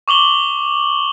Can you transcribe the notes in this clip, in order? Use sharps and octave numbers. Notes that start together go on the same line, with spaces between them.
C#6 D6 F#7 G7